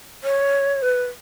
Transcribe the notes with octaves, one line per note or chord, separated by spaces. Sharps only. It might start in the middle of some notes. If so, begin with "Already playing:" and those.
C#5
B4